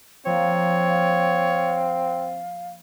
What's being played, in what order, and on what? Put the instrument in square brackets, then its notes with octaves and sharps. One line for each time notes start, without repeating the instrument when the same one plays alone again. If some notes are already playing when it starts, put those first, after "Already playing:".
[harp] F3 A#3 [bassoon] C4 [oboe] C#5 [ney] F5